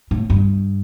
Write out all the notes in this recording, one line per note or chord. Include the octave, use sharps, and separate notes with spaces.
A2
G2